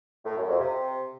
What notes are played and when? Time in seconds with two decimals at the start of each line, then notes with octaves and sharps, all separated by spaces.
0.25 A2
0.36 F#2
0.48 F2
0.60 C3